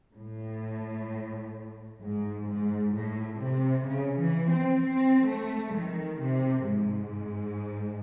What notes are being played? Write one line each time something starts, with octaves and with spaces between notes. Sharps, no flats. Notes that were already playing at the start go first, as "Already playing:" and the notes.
A2
G#2
G#2
A2
C3
C#3
E3
C4
C4
A3
D#3
C3
G#2